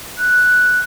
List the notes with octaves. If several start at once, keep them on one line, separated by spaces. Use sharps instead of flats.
F#6